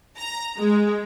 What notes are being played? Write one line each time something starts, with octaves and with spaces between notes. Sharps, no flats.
A#5
G#3